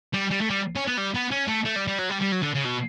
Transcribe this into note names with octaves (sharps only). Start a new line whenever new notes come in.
G3
G3
A3
G3
C#4
B3
G3
B3
C#4
A3
A3
G3
G3
F#3
G3
G3
F#3
D3
C#3
B2